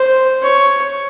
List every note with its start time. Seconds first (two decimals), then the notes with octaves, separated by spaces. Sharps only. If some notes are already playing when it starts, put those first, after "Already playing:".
Already playing: C5
0.43 C#5